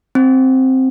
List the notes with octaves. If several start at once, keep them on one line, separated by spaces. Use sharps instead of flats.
C4